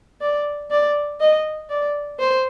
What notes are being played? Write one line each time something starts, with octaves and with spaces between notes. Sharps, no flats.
D5
D5
D#5
D5
C5